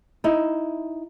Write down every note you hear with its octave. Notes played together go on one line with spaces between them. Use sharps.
D#4 E4